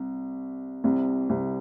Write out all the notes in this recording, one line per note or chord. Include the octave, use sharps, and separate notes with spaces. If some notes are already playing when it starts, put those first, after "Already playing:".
Already playing: C2
C2 C3
C2 C3